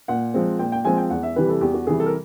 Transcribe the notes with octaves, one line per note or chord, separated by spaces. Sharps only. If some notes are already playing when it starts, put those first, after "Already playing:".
A#2 F#5
F3 G#3 C4
A#2 G5
G5
F3 G#3 C4 G#5
G5
E2 F#5
E5
C3 E3 G3 B4
A4
E2 G4
F#4
C3 E3 G3 G#4
A4
A#4